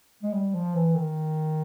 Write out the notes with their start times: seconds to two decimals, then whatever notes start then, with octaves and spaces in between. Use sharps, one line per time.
0.23 G#3
0.33 G3
0.54 F3
0.75 E3
0.96 D#3